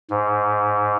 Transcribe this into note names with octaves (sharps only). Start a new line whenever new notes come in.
G#2